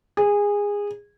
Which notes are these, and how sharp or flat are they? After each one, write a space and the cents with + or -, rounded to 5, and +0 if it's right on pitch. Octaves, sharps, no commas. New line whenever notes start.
G#4 -20